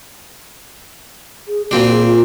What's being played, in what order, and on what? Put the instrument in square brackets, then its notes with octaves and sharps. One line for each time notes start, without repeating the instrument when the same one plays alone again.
[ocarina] G#4
[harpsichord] A#2 C4 D4 [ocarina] F#4
[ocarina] G#4
F4